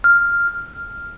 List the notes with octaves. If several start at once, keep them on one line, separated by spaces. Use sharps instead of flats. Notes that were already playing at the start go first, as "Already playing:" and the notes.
F6